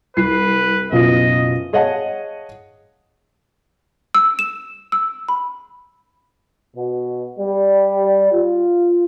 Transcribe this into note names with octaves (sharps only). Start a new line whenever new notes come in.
C2 B4 C7
F#1 B2 F4 D#5
G#4 C#5 D#5 F5 F#5 A5
E6
E7
E6
B5
B2
G3
F4